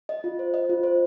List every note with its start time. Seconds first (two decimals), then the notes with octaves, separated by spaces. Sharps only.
0.09 D#5
0.24 F4
0.39 C5
0.54 D#5
0.70 F4
0.83 C5